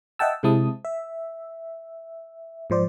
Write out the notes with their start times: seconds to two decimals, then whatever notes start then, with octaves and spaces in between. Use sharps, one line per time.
0.19 D#5 E5 F#5 G5 A5 E6
0.43 C3 G#3 C4 E4 A5 D#6
0.85 E5
2.70 G#2 F3 C5 D5